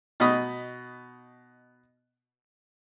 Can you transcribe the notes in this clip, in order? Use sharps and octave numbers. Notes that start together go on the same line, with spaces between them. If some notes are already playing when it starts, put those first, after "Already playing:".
B2 D#4 B5 D#6